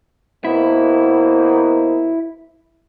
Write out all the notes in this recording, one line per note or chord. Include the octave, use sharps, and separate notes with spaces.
B2 A#3 E4 C5